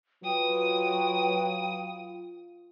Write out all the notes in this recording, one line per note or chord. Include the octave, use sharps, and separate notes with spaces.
F#3 F4 B4 G5 D#6